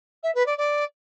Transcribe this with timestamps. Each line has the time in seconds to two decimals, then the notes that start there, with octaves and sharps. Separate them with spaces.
0.23 E5
0.34 B4
0.46 D5
0.57 D5